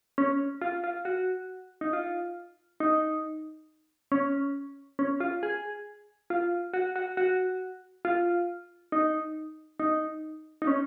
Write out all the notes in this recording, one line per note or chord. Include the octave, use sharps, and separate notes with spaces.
C#4
F4
F4
F#4
D#4
F4
D#4
C#4
C#4
F4
G#4
F4
F#4
F#4
F#4
F4
D#4
D#4
D#4
C#4